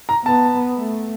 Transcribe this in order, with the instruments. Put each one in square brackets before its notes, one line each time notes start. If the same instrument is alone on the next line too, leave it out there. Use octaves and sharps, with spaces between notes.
[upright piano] A#5
[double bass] B3 [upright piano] A5
[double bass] A3